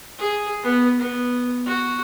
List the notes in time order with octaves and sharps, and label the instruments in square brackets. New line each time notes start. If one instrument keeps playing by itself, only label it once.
[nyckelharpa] G#4
B3
B3
F#4